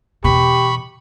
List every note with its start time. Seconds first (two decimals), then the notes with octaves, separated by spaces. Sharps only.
0.24 E2 B2 G4 B5 C#6